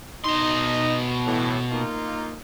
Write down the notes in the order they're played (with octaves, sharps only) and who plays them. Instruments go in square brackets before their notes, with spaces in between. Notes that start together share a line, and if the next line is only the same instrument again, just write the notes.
[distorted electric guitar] B2 C6 [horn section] D#4 D#5
[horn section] A2 E3
A#3 D#4 F4